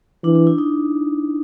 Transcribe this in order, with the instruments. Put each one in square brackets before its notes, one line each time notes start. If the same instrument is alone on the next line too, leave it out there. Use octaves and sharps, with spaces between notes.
[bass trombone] E3 [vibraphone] D4
[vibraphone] D4
E4
D#4